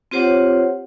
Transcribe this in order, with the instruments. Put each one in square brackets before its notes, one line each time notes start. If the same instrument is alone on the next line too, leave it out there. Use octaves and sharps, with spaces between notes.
[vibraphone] C4 F4 G4 C5 C#5 F#5